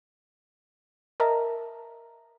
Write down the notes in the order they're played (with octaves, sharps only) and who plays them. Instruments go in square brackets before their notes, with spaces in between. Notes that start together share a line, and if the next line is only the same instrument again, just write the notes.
[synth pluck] A#4 D#5 E5 A5 A#5